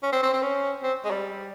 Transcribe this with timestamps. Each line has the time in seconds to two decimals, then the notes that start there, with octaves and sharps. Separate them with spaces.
0.03 C#4
0.12 C4
0.23 C4
0.34 C4
0.43 C#4
0.83 C4
1.05 G#3
1.11 G3